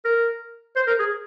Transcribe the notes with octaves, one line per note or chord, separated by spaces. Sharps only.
A#4
C5
A#4
G#4